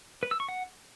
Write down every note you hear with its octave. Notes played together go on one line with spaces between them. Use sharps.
B4
E6
C#6
F#5